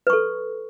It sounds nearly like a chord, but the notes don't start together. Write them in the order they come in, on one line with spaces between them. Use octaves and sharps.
B4 C#6 A4